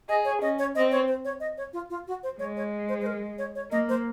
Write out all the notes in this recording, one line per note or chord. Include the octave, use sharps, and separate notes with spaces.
G#4 D#5
C#5
C#4 D#5
C#5
C4 D#5
C#5
C5
C#5
D#5
C#5
F4
F4
F#4
C5
G#3 C#5
C#5
C5
C5
A#4
C#5
C#5
A#3 D#5
C5